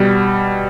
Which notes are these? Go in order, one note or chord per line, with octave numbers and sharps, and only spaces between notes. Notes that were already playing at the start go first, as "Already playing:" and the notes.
Already playing: B2 G3